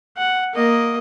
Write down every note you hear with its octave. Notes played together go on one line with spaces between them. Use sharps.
F#5
A#3 D#5